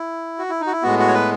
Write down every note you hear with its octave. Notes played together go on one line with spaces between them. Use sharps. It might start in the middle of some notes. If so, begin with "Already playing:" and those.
Already playing: E4
F#4
E4
D#4
F#4
E4
A2 G#3 B3 F#4
F#4
C#5
B4